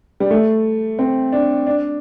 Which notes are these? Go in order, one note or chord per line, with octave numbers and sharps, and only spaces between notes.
G3
A3
C4
D4
D4